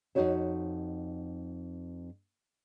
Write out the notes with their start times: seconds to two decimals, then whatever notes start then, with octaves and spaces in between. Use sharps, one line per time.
0.15 F2 B2 D#4 F#4 C#5 E5